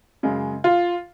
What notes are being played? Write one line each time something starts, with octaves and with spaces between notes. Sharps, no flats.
F#2 C#3 G#3
F4